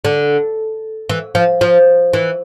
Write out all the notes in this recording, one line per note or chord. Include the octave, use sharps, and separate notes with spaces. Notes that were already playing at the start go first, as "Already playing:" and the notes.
D3
E3
F3
F3
E3